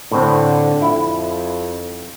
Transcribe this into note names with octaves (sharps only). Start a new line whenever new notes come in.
A2 D3 C4
F2 E4